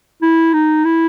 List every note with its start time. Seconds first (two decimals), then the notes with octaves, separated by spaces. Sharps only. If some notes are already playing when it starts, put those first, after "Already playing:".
0.22 E4
0.53 D#4
0.85 E4